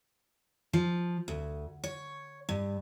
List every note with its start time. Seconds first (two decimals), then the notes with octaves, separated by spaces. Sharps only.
0.73 F3
1.28 D2
1.84 C#5
2.49 G2